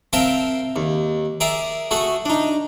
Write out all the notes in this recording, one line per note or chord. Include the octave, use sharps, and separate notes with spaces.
C4 A#4 E5 F5 G5 A5
D#2
G#4 A#4 D5 E5
A3 F#4 G#4
D4 D#4